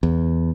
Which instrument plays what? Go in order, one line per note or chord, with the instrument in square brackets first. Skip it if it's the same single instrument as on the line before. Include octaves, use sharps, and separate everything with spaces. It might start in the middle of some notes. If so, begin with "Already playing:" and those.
[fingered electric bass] E2